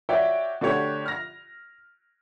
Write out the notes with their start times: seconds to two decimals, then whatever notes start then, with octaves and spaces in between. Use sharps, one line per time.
0.09 F#4 C#5 D5 E5 G5
0.61 D3 A3 F#4 G4 C#5
1.06 F6 A#6